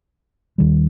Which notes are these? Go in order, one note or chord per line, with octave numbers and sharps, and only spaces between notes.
D#2 D#3 G3